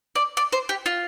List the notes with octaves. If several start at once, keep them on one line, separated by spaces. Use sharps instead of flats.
D5
D5
C5
G4
F4